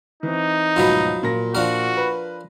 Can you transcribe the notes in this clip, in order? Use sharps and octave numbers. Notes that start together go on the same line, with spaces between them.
E3 C4 D#4
D2 G#2 B2 F3 F#3 B4
A#2 A#6
F3 D4 F#4 A#4
B4